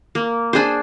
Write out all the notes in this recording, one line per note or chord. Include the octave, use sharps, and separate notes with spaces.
A#3
D4 G#4 C5